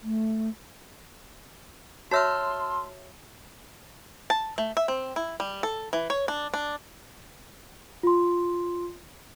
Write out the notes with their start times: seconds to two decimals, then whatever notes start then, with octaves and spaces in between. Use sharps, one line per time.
0.03 A3
2.11 F#4 C#5 E5 A5 C6 E6 F6
4.30 A5
4.58 A3
4.77 E5
4.88 C4
5.16 E4
5.40 G3
5.63 A4
5.93 E3
6.10 C#5
6.28 D4
6.54 D4
8.03 F4 C6